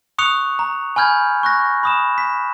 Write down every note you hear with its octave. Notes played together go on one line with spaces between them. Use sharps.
C#6 D#6 F#6 C#7 F7
A#5
G#5 B5 F6 G6 G#6
C#6 F#6 A#6
B5 D#6 E7
B6